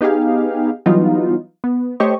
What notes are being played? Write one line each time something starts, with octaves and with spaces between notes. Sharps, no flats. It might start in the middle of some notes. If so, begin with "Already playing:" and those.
B3 D#4 G4 G#4 F5
E3 F#3 G3 B3 D#4 F4
B3
A3 G4 C5 C#5 D#5 C#6